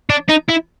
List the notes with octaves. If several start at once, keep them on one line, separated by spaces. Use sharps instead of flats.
D4
D#4
E4